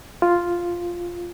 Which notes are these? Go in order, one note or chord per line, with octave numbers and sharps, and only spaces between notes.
F4